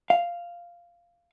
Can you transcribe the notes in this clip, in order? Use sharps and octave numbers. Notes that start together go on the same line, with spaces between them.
F5